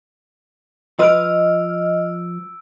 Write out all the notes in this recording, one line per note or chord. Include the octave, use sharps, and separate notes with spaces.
F3 B4 D#5 E6 F6 D7